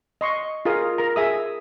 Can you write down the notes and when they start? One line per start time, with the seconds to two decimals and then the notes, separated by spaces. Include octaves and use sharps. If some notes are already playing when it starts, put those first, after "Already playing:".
0.21 D#5 C6 C#6
0.65 F4 G#4 A#4 F5 D#6
0.98 A#4 A#5
1.16 G#4 E5 D#6